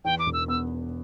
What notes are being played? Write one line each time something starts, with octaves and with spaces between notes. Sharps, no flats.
E2 G5
D6
E1
E6
B3 E6